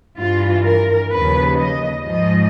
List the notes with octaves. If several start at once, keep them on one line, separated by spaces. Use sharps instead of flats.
G2 E3 F4
A#4
D#2 C#3 F3 B4
D#5
G#2 F3 D#5